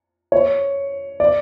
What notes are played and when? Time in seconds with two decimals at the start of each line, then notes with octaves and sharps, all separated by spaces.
0.32 C#5
1.20 D5